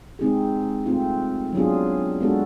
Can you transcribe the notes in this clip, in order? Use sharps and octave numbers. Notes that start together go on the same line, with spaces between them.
G#3 C4 D#4 G#4
A3 C4 F4
F#3 B3 D4 F4 G#4
G#3 B3 D4 F#4 A4